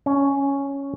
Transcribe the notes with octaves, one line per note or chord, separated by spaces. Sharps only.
C#4